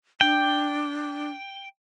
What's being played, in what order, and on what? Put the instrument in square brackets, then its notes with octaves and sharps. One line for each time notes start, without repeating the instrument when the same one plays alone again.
[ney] D4 [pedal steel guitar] G5